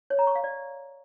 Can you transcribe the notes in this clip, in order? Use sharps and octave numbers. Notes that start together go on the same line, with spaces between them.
C#5
A#5
C#6
F5
D5